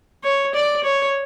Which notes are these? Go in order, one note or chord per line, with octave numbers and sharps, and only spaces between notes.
C#5
D5
C#5